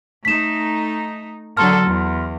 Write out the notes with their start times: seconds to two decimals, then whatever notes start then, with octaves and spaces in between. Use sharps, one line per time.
0.25 A3 D#4 B6 E7
1.57 D3 F#3 A4 C6 F6
1.87 E2